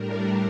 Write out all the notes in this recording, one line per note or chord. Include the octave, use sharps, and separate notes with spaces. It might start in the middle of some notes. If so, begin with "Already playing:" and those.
Already playing: A2 G3 D4 A#4